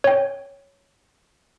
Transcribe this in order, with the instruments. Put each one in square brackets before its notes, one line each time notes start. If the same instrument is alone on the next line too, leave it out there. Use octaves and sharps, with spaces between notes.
[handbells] C#5 G5